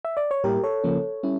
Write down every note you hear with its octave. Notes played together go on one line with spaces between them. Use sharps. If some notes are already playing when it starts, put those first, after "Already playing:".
E5
D5
C#5
A2 G3 A#3 E4 G4 A#4
A4 C#5
C#3 F3 A#3 C#4
G3 C#4 E4